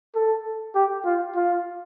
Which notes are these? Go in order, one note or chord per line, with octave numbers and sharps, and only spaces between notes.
A4
G4
F4
F4